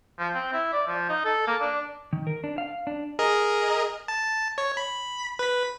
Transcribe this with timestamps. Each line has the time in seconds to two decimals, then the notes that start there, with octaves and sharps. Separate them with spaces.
0.19 F3
0.35 C4
0.53 E4
0.73 D5
0.88 F3
1.09 D#4
1.25 A4
1.47 A#3
1.61 D4
2.13 D#3
2.27 A#4
2.44 D4
2.58 F5
2.87 D4
3.19 G#4 A#4 D#5
4.08 A5
4.58 C#5
4.77 B5
5.39 B4 B6